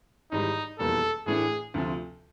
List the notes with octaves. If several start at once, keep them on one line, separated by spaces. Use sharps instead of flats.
G#1 G#2 E3 G3 D#4
F1 E2 B2 G3 A#3 A4
A2 E3 A3 D4 G#4
D2 C3 F3